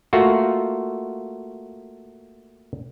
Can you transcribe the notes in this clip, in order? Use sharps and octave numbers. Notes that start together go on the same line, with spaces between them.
A3 A#3 F4 F#4